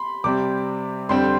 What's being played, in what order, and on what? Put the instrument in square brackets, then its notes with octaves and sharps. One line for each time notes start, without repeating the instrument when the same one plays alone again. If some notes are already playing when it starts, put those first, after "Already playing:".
Already playing: [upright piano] B5 C6
C3 G3 C4 D6
F2 D3 G3 C4 C6